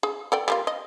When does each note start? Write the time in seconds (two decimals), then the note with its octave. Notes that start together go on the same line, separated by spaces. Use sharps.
0.03 G#4
0.32 A4 D5 G5
0.48 G3 A#3 F4
0.67 D#5